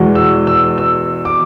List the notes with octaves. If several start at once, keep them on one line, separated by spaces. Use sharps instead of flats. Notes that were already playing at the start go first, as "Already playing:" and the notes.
Already playing: E2 B2 G#3
E6
E6
E6
D6